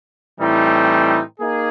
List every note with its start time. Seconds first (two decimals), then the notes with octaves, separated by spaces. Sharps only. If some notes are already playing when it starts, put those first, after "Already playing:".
0.40 A2 E3 G3 C4 D#4
1.40 A#3 D#4 G#4